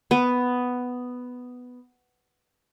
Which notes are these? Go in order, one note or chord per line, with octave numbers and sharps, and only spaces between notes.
B3 B4